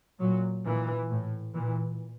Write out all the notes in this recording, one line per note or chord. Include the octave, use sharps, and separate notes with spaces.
A#2 F#3
A#2 E3
A2
A#2 E3